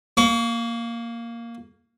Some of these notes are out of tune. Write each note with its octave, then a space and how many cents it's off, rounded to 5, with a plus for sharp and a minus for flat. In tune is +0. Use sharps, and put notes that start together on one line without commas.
A#3 +0 C#6 +40